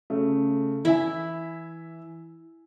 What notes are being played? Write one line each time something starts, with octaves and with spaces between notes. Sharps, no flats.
C#3 A3
E3 E4 E5 G#5